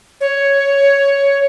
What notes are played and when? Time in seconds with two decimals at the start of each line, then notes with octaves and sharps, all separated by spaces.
0.21 C#5